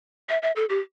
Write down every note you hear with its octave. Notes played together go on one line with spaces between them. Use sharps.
E5
E5
A4
G4